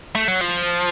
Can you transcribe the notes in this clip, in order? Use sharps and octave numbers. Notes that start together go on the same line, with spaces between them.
A3
F#3
F3